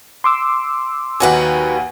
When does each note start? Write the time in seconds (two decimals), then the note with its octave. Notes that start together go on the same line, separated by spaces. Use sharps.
0.24 C6 D6 E6
1.20 D#2 F#3 D#4 B4 F#5 G#5